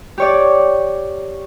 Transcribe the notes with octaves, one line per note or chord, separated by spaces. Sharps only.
G4 C#5 D5